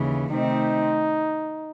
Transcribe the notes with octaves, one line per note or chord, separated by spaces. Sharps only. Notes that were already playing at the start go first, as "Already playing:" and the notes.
Already playing: D#2 C#3 E3
C3 D#3 A3 C4 D#4